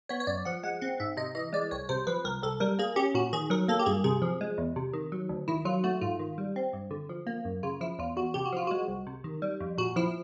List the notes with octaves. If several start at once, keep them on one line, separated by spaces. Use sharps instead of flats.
B3 C#5
C#5
F#2 D5
F3 F#5
G#3 F#5
C4 F#5
G#2 E5
C3 D#5
E3 D#5
G#3 D5
C2 C#5
C3 C5
F3 B4
C2 A#4
C2 A4
G3 A#4
A#3 G#4
C#4 G4
A#2 F#4
D#3 G#4
F#3 A#4
A#3 A4
G4
G2 G#4
C3 G#4
F3
G#3
E2
C3
D#3
F#3
D2
D#3 E4
F#3 F4
A3 F#4
G#2 F4
D#3
G3
C4
G2
D3
F3
A#3
F#2
C#3 F4
F3 E4
E2 F4
E2 F#4
C3 G4
F#4
F3 F4
G#3 F#4
C2
C3
D#3
G3
F2
A#2 F#4
F3 E4